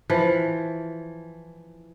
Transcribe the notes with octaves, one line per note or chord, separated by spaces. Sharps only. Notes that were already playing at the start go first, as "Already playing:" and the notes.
E3 F3